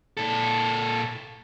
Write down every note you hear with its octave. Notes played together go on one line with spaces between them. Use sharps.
A#2 A4